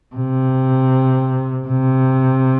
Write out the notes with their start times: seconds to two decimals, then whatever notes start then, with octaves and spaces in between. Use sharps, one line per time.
0.16 C3
1.67 C3